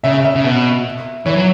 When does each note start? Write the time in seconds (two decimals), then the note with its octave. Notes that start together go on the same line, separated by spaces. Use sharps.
0.04 C#3 E5
0.24 E5
0.35 C#3
0.44 B2
1.26 E3 C#5
1.36 F#3